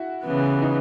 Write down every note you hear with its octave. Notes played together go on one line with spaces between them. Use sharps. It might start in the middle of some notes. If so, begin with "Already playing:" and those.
Already playing: E4 F#4
C#3 E3 B3
D#4